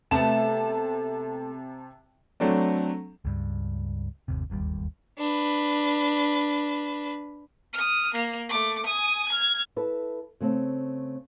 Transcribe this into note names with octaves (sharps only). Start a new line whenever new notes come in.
C3 A3 B3 A5 E7
F#3 A3 C4 D4
C#2 G2
G1 D#2 C3
D1 G1 D#2 G3
D4 B4
D#6 F6
A#3 F7
A3 D6
G#5 D#6
F6 G#6
E4 A4 B4
C#3 A3 C4